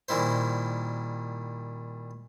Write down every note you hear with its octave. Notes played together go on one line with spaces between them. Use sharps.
A#2 D#3 G3 E4 C5